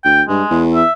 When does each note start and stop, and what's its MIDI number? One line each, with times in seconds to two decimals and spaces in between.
0.05 0.23 38
0.05 0.22 79
0.29 0.43 43
0.29 0.62 56
0.51 0.83 40
0.74 0.92 76